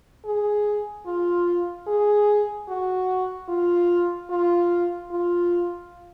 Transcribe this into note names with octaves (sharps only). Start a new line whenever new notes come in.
G#4
F4
G#4
F#4
F4
F4
F4